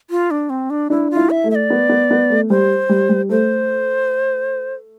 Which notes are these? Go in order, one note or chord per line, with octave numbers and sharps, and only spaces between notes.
F4
D4
C4
D4
D4 E4
F4
E4
E5
A3
E5
D5
B3
B3
B3
A3
G3 C5
G3
G3
A3 C5